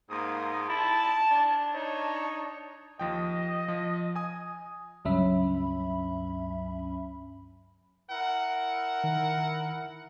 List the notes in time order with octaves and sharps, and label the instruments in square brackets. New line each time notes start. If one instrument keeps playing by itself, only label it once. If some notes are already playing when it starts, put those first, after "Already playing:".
[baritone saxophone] G#2 [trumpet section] A#3 D#6
[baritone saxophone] E4 [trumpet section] A5
[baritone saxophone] D4
[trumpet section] D#4 C#5
[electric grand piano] D#2 F3 G5 [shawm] D#5
[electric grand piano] F3
G#5 D#6
[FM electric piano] C#2 G2 F#3 C#4 E5 B5
[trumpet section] E4 A#4 F#5
[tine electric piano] D#3